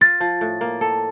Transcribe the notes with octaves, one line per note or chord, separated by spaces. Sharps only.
F4 A6
F3
A2
A#3
A4